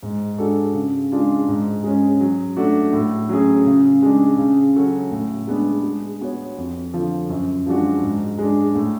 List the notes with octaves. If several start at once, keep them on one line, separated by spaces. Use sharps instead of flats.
G#2
G#3 D4 F#4 A4
C#3
G#3 D4 F4
G#2
G#3 C#4
F#3
A3 D4 F#4
A2
F#3 C#4 G#4
C#3
G#3 D4
C#3
F#3 C#4 F#4 A4
A2
G#3 B3 D4
G#3
B3 F#4 C#5
F2
D3 F3
F#2
F3 G#3 D4 F#4
G#2
G#3 D4
A2